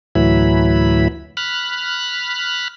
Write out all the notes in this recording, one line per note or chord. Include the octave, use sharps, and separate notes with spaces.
D2 A2 E3 F#3 E4 B5
B5 F6 F#6